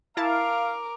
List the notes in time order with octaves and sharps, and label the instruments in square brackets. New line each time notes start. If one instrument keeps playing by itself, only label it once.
[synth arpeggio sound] E4 A5 A6 [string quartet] A#4 D6 [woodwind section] F5